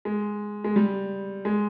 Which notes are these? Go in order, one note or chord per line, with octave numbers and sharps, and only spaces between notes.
G#3
G#3
G3
G#3